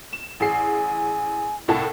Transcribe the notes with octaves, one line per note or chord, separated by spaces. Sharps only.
E7
A1 G#4 G#5 C7
C2 A2 A5